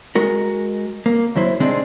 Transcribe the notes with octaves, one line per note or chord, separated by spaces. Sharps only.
G#3 F#4 A#4
A#3
D#2 F#3 E4 C5
C3 D#3 G#3 C4 D4